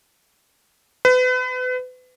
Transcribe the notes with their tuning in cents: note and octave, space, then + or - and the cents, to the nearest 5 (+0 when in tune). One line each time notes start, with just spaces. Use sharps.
B4 +35